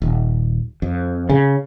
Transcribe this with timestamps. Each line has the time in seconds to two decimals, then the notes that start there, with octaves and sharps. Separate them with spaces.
0.02 D#1
0.82 F2
1.29 C#3